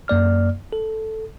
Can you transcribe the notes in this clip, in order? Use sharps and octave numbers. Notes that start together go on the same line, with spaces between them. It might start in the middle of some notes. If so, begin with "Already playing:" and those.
F#2 A#3 D5 F6
A4